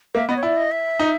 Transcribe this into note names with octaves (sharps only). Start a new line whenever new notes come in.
A#3 E5
B3 D#5
C#5
E4 D5
D#5
E5
D#4